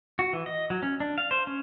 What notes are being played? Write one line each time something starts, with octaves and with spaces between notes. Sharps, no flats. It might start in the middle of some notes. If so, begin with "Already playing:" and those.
F#4
E3
D#5
F#3
C#4
D4
F5
C5
C#4